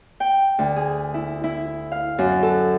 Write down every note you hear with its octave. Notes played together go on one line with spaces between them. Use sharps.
G5
D2
G#4
E4
E4
F5
F#2
A4